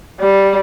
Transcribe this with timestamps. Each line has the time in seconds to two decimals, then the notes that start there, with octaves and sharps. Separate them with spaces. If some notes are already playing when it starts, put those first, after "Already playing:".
0.20 G3